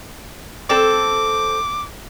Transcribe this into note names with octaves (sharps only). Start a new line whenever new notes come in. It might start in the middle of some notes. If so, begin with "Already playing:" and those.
C4 A4 D6